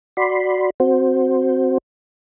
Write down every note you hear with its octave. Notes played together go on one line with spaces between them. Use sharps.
F#4 D5 B5 C6
C4 F#4 C5